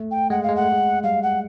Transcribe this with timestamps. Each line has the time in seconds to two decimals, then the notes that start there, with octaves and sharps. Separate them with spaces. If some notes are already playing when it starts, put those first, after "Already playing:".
Already playing: A3
0.11 G5
0.30 G#3 F#5
0.43 F5
0.48 G#3
0.56 A3 F#5
0.72 G#3
1.03 G3 F5
1.23 F#5